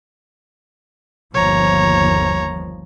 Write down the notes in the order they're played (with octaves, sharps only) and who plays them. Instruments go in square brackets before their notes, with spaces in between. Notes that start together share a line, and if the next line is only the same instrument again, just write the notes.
[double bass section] G1 D#2 F3 [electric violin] C#5 A#5